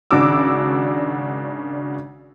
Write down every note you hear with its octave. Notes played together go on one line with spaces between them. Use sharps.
G#1 C#3 D4 F#4 D6 E6